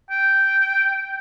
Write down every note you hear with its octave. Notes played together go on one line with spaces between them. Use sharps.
G5